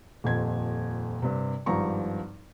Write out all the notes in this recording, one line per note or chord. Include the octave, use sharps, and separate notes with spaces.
D#1 F2 G#6
G2 C3
G#1 G2 F3 A#5 C#6